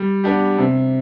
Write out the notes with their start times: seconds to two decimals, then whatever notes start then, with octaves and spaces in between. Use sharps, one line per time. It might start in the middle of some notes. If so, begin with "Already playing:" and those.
Already playing: G3
0.24 B3 D4 G4
0.58 C3